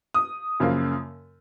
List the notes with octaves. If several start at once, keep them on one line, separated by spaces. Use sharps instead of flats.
D#6
F#2 C#3 F3 A#3